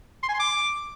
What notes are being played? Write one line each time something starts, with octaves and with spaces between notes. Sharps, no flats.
C6
G#5
C6
D6